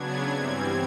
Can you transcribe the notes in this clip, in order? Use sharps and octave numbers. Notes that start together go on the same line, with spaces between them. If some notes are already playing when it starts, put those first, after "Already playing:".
Already playing: C#3 F#3 B3 D4 G#6
G2 E3 G3 C4 G#6